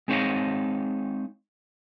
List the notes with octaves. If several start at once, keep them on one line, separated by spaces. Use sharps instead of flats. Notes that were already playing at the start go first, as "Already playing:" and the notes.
G#3 C4 D#4 C#5 D#5 F5